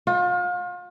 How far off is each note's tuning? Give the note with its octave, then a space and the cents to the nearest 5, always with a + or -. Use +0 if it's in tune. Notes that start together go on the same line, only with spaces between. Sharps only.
F4 +35